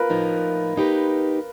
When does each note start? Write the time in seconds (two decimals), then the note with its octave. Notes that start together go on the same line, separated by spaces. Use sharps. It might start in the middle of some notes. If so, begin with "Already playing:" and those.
Already playing: F4 A#4 B4
0.10 A2 F3 A#3 D#4
0.76 A#3 D#4 G4 B4